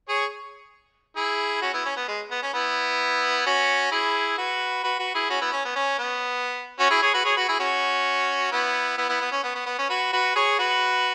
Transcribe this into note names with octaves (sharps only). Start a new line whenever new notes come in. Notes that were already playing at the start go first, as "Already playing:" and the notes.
G#4 C#5
E4 G#4
C#4 F#4
B3 E4
C#4
B3
G#3
B3
C#4
B3 E4
C#4 F#4
E4 G#4
F#4 B4
F#4 B4
F#4 B4
E4 G#4
C#4 F#4
B3 E4
C#4
B3
C#4
B3
C#4 F#4
E4 G#4
G#4 C#5
F#4 B4
G#4 C#5
F#4 B4
E4 G#4
C#4 F#4
B3 E4
B3 E4
B3 E4
B3
C#4
B3
B3
B3
C#4
F#4 B4
F#4 B4
G#4 C#5
F#4 B4